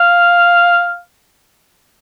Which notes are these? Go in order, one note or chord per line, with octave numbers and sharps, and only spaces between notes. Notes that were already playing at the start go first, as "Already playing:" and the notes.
Already playing: F5